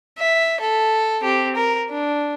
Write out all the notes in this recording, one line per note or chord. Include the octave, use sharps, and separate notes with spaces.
E5
A4
C4 G4
A#4
D4